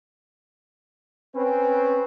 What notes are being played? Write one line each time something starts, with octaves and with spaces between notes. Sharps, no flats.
C4 C#4 B4